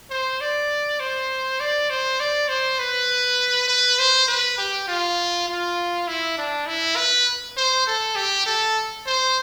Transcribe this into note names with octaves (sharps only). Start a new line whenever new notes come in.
C5
D5
C5
D5
C5
D5
C5
B4
B4
C5
B4
G4
F4
F4
E4
D4
E4
B4
C5
A4
G4
A4
C5